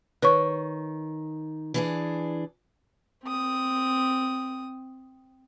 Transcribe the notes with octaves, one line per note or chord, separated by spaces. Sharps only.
D#3 B4 C#5 C#6
E3 D4 G#4
C4 D#6